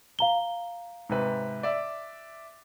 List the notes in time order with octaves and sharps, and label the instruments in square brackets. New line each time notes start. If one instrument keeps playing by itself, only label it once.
[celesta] F5 A#5 G7
[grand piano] G#2 C3 B4
D5 E5